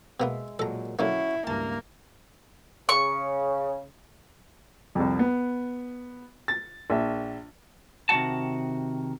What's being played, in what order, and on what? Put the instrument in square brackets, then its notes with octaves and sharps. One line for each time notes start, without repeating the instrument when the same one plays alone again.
[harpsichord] B2 A#3 B3 [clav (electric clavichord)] G#3 E5
[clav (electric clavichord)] A#2 F#3 G#3 [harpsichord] A4 A#5
[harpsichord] D3 F#3 A#3 [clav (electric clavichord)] C#4 F#4 [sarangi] E4
[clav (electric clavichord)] C#2 G2 [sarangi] A#3 [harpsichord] A5
[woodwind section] C#3 [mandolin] C#6
[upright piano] C2 F2
B3
A6
A#1 E5
[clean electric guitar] C3 D#3 G#3 F#4 F#5 A5